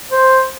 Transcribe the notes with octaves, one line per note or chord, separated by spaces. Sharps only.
C5